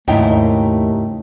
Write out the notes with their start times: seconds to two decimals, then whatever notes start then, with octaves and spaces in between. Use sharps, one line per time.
0.08 D#2 G#2 C#3 A3 E4 G5 A#5